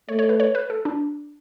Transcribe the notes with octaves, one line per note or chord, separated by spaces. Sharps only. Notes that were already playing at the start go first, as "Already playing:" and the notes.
A3 C#5
C#5
B4
C#5
B4
A4
D4